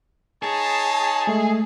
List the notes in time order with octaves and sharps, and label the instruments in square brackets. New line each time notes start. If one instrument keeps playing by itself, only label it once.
[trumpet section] D#4 C#5 A5 [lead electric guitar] G#4
[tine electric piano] G#3 A3